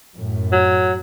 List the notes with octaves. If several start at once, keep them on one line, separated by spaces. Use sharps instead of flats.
F#2 A2
F#3